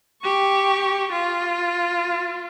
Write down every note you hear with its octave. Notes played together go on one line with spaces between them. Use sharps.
G4 C#6
F4